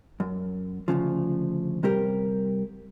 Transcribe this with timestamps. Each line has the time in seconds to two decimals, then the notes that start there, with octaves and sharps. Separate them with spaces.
0.20 F#2
0.88 D2 A2 C#3 F3
1.83 C3 G3 G4 A#4